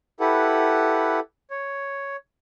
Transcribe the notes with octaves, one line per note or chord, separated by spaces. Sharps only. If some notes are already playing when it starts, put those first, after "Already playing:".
E4 G4 A4 B4 F#5
C#5